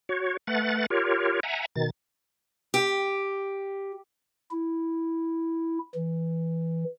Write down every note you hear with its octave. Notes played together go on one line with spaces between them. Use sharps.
F#4 C#5
A3 B4 F#5 A6
F4 G4 A#4 C#5
E5 F#5 G#5 A#5
B2 D#3 A6
G4
E4
E3